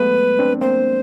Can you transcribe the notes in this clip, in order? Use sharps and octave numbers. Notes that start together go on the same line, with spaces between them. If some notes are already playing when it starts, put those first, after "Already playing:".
Already playing: F#3 G#3 A3 B3 B4
C4 D4
A#3 C4 C5